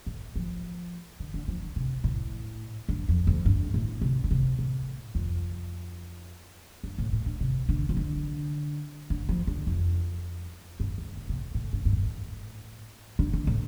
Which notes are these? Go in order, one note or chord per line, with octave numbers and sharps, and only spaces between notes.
A2
F3
D3
D3
F3
D3
C3
A2
G2
F2
F2
G2
A2
C3
D3
C3
A2
F2
G2
A2
A2
D3
C3
D3
F3
D3
D3
F3
D3
F2
G2
G2
A2
C3
A2
A2
G2
G2
A2
D3
D3
A2